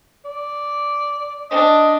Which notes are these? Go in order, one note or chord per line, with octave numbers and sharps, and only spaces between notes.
D5
D4 D#5